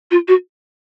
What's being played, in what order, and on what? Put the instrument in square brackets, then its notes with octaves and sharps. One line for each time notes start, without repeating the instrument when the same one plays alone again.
[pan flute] F4
F#4